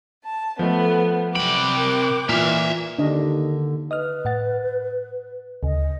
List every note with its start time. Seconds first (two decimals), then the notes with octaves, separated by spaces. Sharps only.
0.24 A5
0.59 F3 A3 B3 A4
1.36 C3 F#3 G5 B5 D6 F#6 D7
1.77 A#4
2.29 A#2 E3 F4 E5 F5
2.99 D#2 D3 D4 D#5
3.91 B4 D#5 D#6 F6
4.25 A2 F#5 A6
5.63 D2 C#3 D#5